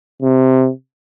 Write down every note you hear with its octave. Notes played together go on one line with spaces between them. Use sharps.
C3